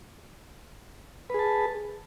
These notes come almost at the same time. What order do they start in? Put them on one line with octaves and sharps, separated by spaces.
B4 G#4 A5